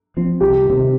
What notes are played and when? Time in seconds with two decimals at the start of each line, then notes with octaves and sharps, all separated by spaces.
0.17 F3 C4
0.40 C2 G4
0.66 C3 D#3